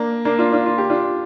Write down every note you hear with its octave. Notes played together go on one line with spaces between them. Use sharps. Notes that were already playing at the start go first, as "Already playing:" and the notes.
Already playing: A#3 D4
A#3 D4
D4 F4
D4 F4
F4
G4
D4 F4